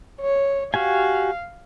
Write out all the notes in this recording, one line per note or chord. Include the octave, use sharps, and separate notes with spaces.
C#5
F#4 G4 F5 G#5